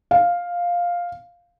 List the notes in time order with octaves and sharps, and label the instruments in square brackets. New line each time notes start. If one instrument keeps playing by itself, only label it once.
[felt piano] F5